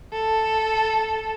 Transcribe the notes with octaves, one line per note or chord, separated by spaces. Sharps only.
A4